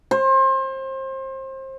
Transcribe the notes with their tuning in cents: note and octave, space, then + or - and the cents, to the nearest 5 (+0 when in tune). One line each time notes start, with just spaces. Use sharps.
C5 +30